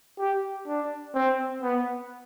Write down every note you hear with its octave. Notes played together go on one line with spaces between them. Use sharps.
G4
D4
C4
B3